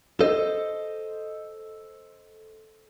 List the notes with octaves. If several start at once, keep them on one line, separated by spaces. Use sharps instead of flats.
A4 C5 D#5